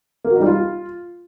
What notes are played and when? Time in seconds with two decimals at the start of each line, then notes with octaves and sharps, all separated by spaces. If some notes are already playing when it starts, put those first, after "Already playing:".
0.24 A#3
0.30 F#4
0.36 D#4
0.41 G3
0.47 F4